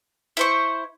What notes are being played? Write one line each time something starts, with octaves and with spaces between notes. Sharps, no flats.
E4 C5 C#6